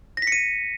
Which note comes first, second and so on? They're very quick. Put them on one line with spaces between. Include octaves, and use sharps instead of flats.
A#6 B6 C#7 D#7